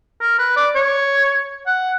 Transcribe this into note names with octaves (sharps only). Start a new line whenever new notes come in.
A#4
B4
D5
C#5
F#5